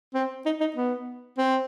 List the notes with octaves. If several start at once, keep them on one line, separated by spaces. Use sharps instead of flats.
C4
D#4
D#4
B3
C4